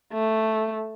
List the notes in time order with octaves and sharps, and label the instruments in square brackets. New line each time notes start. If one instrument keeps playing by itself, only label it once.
[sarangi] A3